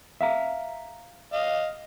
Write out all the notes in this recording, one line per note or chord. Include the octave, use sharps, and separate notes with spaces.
E5 F5 A#5
D#5 F5